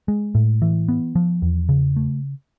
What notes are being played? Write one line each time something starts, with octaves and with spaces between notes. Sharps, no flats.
G#3
A2
E3
B3
F3
E2
C#3
A3